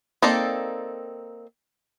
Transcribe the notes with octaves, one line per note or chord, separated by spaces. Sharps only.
A#3 C4 D#4 A4 D5